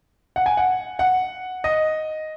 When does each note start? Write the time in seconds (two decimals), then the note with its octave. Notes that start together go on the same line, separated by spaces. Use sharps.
0.36 F#5
0.46 G#5
0.57 F#5
0.99 F#5
1.64 D#5